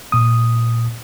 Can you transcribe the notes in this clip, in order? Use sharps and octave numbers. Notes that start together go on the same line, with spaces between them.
A#2 D#6